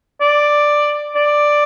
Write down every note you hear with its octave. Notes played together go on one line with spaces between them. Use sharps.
D5
D5